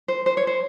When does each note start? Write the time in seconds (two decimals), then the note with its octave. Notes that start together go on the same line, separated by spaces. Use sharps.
0.08 C5
0.26 C5
0.37 C#5
0.47 C5